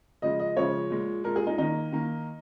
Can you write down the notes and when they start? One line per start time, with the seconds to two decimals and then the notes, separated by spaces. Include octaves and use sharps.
0.22 C#3 F3 G#3 D#5
0.39 D#5
0.56 C#3 F3 G#3 C#5
0.90 A#2 G#3
1.24 A#2 G#3 A#4
1.36 G#4
1.47 D#4
1.58 D#3 A#3 D#4
1.92 D#3 A#3